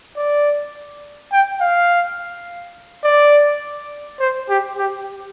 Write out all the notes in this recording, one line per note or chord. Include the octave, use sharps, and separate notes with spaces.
D5
G5
F5
D5
C5
G4
G4